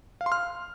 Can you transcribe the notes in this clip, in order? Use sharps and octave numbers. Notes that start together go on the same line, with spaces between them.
F5
C6
F6